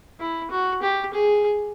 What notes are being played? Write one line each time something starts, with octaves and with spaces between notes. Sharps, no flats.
E4
F#4
G4
G#4